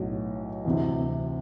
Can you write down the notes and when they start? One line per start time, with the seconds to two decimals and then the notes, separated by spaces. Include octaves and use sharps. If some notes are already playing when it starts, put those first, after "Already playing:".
Already playing: B1 A2 F#3
0.65 D2 C3 E3